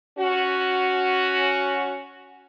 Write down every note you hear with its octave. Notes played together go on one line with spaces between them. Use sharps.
C#4 F#4